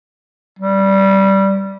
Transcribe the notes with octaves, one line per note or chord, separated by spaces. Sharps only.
G3